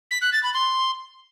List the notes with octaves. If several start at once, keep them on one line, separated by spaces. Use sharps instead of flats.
B6
F#6
A6
B5
C6